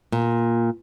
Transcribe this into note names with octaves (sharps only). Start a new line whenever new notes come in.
A#2